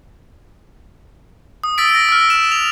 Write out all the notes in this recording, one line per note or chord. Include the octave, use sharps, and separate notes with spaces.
D#6
E6 A6 B6 D7
A#6
E6 F6
E7
F7